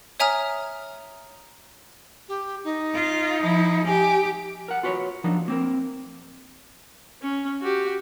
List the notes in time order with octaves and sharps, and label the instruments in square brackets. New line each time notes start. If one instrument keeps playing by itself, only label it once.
[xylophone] C#5 E5 G#5 A#5 D#6 F6
[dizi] G4
D#4
[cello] F4
F3 E4
[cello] G4 [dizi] G#5
[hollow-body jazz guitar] A#4 F#5
F4 F#4 B4 C#5
F3 F#3 A#3 D4 D#4
A#3 C4 A#4
[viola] C#4
F#4 G4